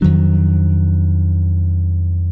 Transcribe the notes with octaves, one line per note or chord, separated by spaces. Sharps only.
F2 D#3 F#3 D4